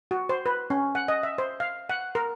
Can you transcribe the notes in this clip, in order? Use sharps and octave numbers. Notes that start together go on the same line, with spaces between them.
F#4
C5
B4
C#4
F#5
D#5
E5
C5
F5
F#5
A#4